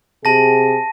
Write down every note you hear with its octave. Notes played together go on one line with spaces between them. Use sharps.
C3 G#4 A5 A#6